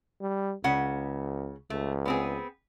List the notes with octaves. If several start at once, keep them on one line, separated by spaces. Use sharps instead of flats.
G3
C#2 C#3 F#5
C#2 A3
B3 C4 G#4